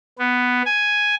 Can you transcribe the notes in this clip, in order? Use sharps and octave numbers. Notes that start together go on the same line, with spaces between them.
B3
G#5